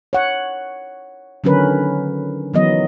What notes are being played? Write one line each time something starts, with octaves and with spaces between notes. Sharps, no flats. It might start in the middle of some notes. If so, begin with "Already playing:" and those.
C#5 F#5
D3 D#3 F#3 C#4 A#4 B4
D#3 E3 F#3 B3 D#5